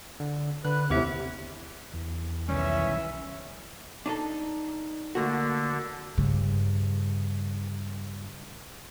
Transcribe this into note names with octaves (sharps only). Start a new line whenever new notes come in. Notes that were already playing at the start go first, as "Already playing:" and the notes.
D3
D3 B4 F#6
D#2 A2 C3 B3 G4 E5
E2
B1 D#3 E3 G3 C#4 E5
D4 D#4 A4
D3 A3 A#3 F#4
G2 C#3